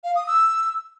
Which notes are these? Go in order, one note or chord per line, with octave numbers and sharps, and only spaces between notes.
F5
D#6
E6